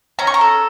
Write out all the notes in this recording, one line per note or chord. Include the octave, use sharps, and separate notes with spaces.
C#4 A#5
C#6
A#5
A4